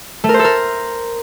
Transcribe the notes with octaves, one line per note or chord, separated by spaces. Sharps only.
A3
A#4
C5
A4
A#4